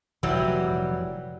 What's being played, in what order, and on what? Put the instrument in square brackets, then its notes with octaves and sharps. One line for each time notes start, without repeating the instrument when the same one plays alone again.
[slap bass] F1 A#2 [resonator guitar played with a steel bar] E3 F#3 G3